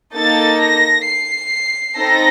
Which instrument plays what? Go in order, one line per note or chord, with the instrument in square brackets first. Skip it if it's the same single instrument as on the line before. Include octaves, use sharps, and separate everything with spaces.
[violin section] A#3 D#4 A4 A6
A#6
C7
C4 D#4 A4 A#6